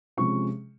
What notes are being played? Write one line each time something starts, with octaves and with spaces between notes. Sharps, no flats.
C3 F3 G#3 C#4 C#6